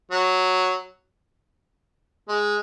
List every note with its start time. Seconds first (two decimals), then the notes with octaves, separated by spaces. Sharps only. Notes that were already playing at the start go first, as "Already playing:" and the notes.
0.11 F#3
2.28 G#3